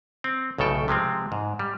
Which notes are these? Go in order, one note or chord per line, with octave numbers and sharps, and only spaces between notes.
C4
B1 A2 C#3 A4 G5
C3 F3 G#3 C4
G#2
G3